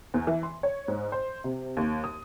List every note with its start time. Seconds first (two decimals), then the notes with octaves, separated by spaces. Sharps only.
0.14 E2
0.27 E3
0.43 C6
0.63 C#5
0.88 G#2
1.12 C5
1.44 C3
1.77 D#2
2.04 D#6